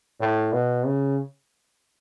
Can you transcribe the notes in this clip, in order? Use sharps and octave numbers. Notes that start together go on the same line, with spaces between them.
A2
B2
C#3